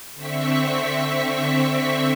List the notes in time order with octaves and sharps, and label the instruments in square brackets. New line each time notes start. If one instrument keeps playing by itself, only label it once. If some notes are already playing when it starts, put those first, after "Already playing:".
[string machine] D3 C4 E5 C#6 B6